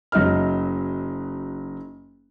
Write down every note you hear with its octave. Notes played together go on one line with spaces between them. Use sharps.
F#1 F#3 D#4 D#5 E5 F6